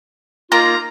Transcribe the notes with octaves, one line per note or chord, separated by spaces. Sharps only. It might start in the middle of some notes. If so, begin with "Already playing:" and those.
A#3 D#4 F4 A#5